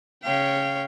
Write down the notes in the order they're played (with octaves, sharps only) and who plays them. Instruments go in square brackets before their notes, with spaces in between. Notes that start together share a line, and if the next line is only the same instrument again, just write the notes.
[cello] C#3 F5 [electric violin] C#5 G5